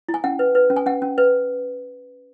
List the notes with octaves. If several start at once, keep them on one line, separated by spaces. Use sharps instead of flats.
E4
G#5
C#4 F#5
B4
B4
C#4
G#5
C#4 F#5
C#4
B4